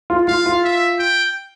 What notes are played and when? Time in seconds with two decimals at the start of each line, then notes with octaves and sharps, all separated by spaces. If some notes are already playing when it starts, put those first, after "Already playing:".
0.10 F4
0.28 F4 F5
0.46 F4
0.64 E5
0.99 G5